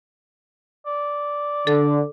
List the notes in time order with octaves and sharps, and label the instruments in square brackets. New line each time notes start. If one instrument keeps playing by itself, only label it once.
[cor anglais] D5
[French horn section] D3 [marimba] A4